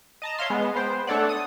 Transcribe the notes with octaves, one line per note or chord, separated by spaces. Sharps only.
D#5 A5 A#5
C#5 E5 F5 C6
G#3 B3
B3 C5 G5
A3 D4 A4 C#5 D5 F#5
D#6